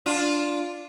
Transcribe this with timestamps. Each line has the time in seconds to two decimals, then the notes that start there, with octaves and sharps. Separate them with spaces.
0.06 D4 F4